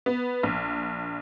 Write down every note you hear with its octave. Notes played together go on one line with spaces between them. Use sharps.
B3
A#1